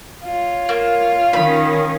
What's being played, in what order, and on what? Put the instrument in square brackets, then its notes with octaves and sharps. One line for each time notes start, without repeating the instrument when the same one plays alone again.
[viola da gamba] F4 C#5
[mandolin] A#3
[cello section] D#3 C#4 [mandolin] B5